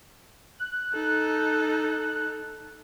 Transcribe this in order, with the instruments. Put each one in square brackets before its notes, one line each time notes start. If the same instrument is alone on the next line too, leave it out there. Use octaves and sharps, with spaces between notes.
[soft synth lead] F#6
[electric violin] D#4 A4